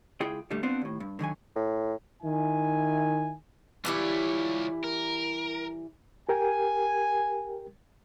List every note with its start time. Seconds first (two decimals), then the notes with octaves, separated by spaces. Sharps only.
0.20 C#2 E4 F4 G#4 G5
0.50 A#2 D3 G3 A3
0.63 B3 C4 D4 F4 C5
0.82 D#2 A2
1.00 G2
1.19 D3 D#3 F#3 G#5
1.56 A2
2.23 D#3 E4 G#5
3.85 E3 G3 E4 F4 C#5
4.84 A#4
6.29 G4 A#4 G5 G#5